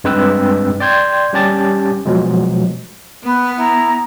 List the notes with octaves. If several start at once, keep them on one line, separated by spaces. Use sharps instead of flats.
G2 G#3 C4 B4 G5 E6
D5 G5 C6 G6 G#6
G3 C#4 G4 A5 A6
B2 F3 F#3 G#3
B3 B4
E4 A#5